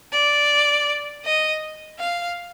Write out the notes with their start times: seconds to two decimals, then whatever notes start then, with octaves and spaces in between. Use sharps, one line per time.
0.13 D5
1.25 D#5
1.99 F5